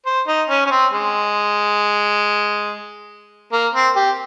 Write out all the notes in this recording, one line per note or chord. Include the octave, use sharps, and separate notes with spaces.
C5
D#4
C#4
C#4
C4
G#3
A#3
C4
G4